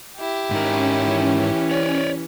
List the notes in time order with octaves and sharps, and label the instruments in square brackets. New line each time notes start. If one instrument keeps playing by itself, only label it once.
[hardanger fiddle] E4 G4
[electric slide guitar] G#2 D#4 A#4 [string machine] C#4
[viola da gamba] E3
[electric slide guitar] C#5 D5